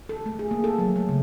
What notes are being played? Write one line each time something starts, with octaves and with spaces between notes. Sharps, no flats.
A4
A3
G#4
A#3
A4
F#3
A3
C#3